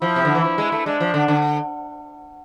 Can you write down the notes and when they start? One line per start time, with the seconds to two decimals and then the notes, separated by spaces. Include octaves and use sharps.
0.02 F3 E4
0.16 C3
0.25 D3
0.35 E3
0.44 F3
0.58 G#3
0.72 A3
0.86 G#3 D4
1.00 F3
1.14 D3
1.28 D3